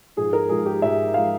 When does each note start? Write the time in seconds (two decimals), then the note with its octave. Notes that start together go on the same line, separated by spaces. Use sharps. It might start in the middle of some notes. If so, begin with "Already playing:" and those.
0.17 G#2 F3 G#3 G#4
0.33 A#4
0.49 G#2 F3 G#3 G#4
0.66 G4
0.82 G#2 F3 G#3 E5
1.14 F3 G#3 F5